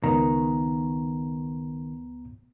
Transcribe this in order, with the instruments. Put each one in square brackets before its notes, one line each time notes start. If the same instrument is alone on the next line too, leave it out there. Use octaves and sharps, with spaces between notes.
[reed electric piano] C#2 B3 A#5 [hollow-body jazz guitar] D#3